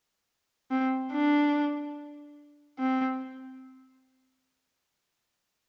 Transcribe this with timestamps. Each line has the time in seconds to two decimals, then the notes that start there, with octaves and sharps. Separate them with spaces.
0.71 C4
1.12 D4
2.79 C4